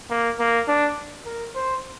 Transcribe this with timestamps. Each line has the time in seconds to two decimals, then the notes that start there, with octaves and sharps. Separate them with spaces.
0.10 A#3
0.40 A#3
0.68 D4
1.26 A#4
1.55 C5